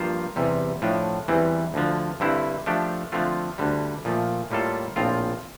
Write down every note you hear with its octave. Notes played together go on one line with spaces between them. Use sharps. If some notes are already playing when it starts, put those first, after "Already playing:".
Already playing: G2 F3 A#3 F4 C5
E2 C3 G3
A2 F3 A3 D4
E2 E3 G3 C4
D2 D3 F3
G2 D3 G3 C4 E4
F3 A3 D4 G4
D3 F3 A3 C4 F4
D2 D3 G3
A#2 F3 A3
A2 G3 A#3 F4 A4
A#1 A2 F3 C4 F4